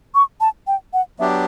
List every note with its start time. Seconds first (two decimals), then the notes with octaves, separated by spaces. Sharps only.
0.15 C#6
0.41 A5
0.67 G5
0.93 F#5
1.19 F#3 B3 D4 G4 E5